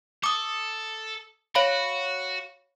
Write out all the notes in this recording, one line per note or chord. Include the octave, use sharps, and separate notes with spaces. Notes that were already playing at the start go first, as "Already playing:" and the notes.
A4 D6 D#6
F#4 C#5 F5 B5